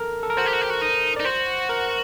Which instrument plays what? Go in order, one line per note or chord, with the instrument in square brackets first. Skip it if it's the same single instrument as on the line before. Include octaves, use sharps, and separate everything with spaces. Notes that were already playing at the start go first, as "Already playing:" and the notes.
Already playing: [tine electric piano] A4 A#4
A4
A#4
[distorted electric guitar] F#4 [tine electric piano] C5
[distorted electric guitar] G4
F#4
G4
F#4
D#4
[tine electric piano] D5
[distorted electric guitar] D#4
[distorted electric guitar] F#4 [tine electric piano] C5
[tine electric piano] A#4